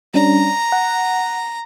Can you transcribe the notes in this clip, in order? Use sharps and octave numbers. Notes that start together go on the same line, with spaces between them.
G3 C#4 D4 A#5
F#5